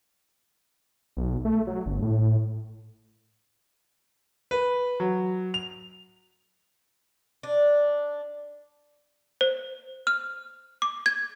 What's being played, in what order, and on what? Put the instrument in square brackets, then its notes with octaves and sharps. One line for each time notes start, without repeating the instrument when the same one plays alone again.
[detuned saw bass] B1
A3
F#3
G1
A2
[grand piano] B4
F#3
F7
[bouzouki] D4
[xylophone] C5
F6
D6
G#6